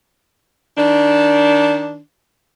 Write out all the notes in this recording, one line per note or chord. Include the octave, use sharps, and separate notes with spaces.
D#3 D4